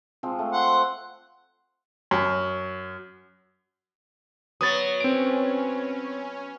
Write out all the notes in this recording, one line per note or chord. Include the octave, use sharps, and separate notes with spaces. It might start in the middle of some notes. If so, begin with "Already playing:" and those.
F3 G#3 C4
A3
F#5 C6
F#2
F#3 B3 D#6 A6
C4 C#4 D7